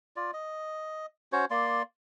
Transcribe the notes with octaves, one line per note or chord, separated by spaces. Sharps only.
F4 D5
D#5
C#4 F#4 C5 C#5
A#3 D5 C6